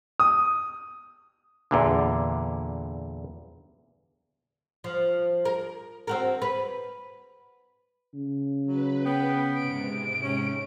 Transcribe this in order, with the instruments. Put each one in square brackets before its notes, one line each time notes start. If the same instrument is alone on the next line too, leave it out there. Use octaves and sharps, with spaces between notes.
[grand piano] D#6
[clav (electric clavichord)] E2 A#2 D3
[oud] F3
A#4
C4 F#4 A#4
B4
[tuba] C#3
[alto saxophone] F#3 [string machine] B4
[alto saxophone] B3 [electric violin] G5
[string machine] G#2 C3 [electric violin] D7
[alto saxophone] C#4